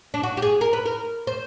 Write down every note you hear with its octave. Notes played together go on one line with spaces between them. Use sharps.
D4
F#4
G4
G#4
A#4
B4
A#4
C5